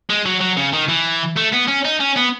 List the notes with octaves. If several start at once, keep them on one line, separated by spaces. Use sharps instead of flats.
G#3
F#3
F#3
C#3
D#3
E3
A3
B3
C#4
D#4
C#4
B3